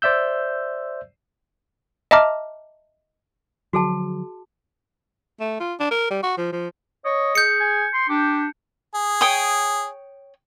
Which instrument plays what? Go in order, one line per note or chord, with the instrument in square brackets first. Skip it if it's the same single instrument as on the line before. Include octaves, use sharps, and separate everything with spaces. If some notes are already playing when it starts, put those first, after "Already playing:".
[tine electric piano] C5 D5 E5 E6 G6
[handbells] D#5 E5 A5 A#5 D6 F6
[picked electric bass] D3 F3 F#3 [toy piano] F#4 G#4 A5
[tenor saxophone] A3
F4
D4
A#4
G3
F#4
F3
F3
[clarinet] C#5 [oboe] D#5
[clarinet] G#4 [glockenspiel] G6 C#7
[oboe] G#5
C6
[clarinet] D4 [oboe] G4
[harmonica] G#4
[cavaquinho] C#5 G5 D#6